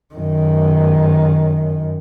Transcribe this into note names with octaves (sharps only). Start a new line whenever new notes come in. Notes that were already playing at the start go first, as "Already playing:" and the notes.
F#2 D#3